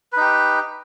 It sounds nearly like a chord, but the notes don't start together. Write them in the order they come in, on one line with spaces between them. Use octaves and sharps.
B4 D#4 G4